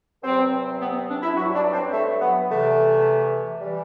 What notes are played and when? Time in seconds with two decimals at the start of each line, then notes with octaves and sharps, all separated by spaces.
0.23 E2 C3 F#3 C4
0.80 B3
0.95 C4
1.09 D4
1.22 E4
1.36 G2 F#3 F#4
1.54 D4
1.73 C4
1.93 A3
2.21 B3
2.49 E2 C3 E3 A3
3.61 E3 G3